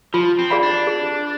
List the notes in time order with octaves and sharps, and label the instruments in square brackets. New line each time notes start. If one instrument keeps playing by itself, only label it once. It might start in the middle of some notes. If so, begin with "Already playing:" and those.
[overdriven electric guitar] F3 [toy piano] F4
[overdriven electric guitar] C4
[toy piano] G#4 D5 F5 B5
[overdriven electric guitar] D4
[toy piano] G#4